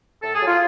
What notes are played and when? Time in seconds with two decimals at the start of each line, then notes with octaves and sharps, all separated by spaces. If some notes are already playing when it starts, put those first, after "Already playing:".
0.22 A2 A4
0.35 G#4
0.41 F#3
0.47 F4